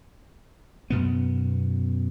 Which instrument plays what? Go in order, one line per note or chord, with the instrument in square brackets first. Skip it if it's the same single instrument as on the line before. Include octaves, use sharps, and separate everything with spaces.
[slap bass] F#2 B2 B3